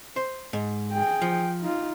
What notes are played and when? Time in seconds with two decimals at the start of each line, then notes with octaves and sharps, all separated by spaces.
0.16 C5
0.53 G#2
0.92 G#4 G5
1.22 F3
1.61 D#4 F4